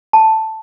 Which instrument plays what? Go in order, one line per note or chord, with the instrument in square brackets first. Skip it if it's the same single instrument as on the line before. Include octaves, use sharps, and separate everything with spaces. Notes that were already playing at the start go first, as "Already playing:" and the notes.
[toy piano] A5